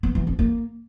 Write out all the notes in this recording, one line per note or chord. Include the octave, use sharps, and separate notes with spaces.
B3
E3
C4
A#3